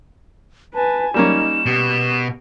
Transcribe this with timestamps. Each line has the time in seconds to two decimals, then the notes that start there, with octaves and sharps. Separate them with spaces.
0.74 B4 G#5 A5
1.14 G3 A#3 C#4 D#4 E7
1.66 B2 G4